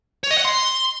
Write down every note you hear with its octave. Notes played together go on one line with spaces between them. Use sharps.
C#5
D#5
F#5
C6